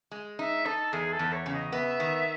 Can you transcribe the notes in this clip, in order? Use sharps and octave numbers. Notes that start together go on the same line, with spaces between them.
G#3
D#4 E5
D#4 A4
E2 G#4
A4
E2
C#5
C#3
D#5
B3 E5
D#3